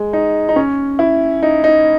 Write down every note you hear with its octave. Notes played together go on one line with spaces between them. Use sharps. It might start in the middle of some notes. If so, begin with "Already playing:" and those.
Already playing: G#3
D#4
D#4
C#4
E4
D#4
D#4